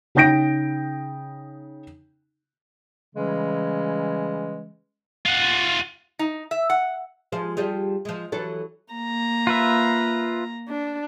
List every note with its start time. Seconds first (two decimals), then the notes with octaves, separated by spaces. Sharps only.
0.15 C#3 D#4 G5 G6 A#6 D7
3.15 C#3 E3 G3 G#3 C#4
5.25 F4 F#5
6.19 D#4
6.51 E5
6.70 F#5
7.32 F3 G#3 C5
7.57 F3 G3 G#4
8.05 F3 G#3
8.32 E3 F#3 A4
8.93 A#3 A#5
9.47 F4 B4 E5
10.68 D4